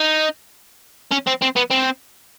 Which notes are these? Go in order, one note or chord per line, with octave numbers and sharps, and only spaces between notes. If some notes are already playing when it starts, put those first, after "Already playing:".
Already playing: D#4
C#4
C4
C4
B3
C4